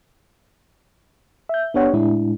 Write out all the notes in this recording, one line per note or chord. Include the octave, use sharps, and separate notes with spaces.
E5 G6
B3 D4 G4 C#5 F#5
A2 G#3 D4 E4